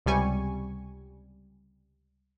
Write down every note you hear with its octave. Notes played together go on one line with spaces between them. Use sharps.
C#2 C3 G3 G#5 C#6